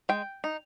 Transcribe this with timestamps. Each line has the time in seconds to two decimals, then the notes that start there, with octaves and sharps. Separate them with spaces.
0.09 G#3 G5
0.44 D#4